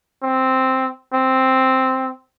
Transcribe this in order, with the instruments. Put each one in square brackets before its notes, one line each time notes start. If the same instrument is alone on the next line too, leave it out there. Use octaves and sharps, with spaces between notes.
[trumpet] C4
C4